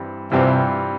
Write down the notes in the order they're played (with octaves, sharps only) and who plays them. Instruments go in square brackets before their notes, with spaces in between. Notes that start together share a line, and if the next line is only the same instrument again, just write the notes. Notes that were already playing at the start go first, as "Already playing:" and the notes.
Already playing: [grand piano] G2 E3 G3 C4
[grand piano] G2 E3 G3 C4 F4 [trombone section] C3